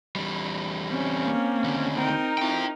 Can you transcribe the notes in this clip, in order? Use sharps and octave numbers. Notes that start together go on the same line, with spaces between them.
E2 G3
C4 C#4
A#3
D#2 D3
C4 D#4 A#4 G5
C4 E4 F4 G5